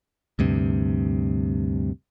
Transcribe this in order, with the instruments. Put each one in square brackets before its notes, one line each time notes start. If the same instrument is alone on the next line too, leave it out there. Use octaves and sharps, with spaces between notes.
[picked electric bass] D2 G2 C3